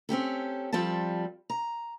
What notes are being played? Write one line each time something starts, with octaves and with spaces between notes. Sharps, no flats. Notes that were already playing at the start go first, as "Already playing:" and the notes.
C4 C#4 G4 A4
F3 G3 C4 A4 A5
A#5